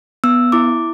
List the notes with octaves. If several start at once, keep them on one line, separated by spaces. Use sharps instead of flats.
B3 E6
E4 D6